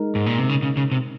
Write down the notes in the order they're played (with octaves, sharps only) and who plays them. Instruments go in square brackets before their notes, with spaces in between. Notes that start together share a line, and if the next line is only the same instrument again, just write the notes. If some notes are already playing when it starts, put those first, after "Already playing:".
Already playing: [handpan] G#3 D#4 A#4
[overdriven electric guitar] G#2
A#2
C3
C#3
C#3
C#3
C3